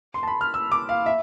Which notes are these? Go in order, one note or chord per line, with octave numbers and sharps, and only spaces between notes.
C6
A5
B5
F6
E6
D6
F5
E5